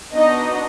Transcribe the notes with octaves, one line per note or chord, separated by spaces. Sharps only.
B3 D4 D#4 F#4 D#5